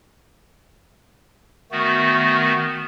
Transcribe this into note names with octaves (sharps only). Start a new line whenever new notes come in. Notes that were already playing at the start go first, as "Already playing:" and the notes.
D#3 A3 B3 F#4